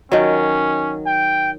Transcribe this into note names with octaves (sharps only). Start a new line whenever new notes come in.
D#3 F#3 C#4
G5